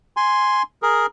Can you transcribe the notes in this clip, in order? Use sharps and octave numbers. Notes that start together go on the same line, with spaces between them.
G#5 C6
G#4 A#4